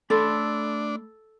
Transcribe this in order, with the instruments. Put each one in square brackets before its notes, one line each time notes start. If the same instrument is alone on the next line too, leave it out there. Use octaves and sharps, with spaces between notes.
[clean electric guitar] A3 B5 C6 [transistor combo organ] D4 [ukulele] A4